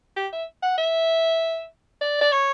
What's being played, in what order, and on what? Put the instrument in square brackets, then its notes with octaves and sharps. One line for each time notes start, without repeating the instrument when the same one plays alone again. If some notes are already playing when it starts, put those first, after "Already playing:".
[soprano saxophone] G4
E5
F#5
E5
D5
D5
C#5